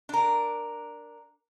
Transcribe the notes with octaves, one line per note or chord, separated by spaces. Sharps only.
D4 A#4